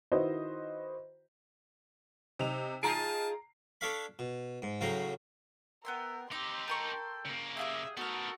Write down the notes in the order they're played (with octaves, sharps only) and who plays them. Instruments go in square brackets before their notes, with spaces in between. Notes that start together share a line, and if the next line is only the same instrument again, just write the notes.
[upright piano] D#3 E4 F#4 B4 C5 D#5
[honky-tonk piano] C3 D#4 F7
[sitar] D#4 F4 G#4 [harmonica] A5 [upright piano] A#5 D7 [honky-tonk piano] C7
[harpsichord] D4 A4 C#5 F5 B5
B2
G#2
A2 C#3 F#3 C5 A#5
[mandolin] B3 G5 C6 [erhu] A#4 [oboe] E5
[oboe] C4 [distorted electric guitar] D#4 G4 [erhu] C6 [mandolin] D6
[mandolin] A4 A#4 C#6 [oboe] G5
[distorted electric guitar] C#3 A#3
[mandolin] G4 F5 G5 [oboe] G#4 [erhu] E5
[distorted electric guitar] B3 A#4 [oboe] D#4 [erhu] F#4 [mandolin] A4 F6